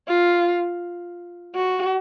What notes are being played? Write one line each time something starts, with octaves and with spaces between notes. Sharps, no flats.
F4
F#4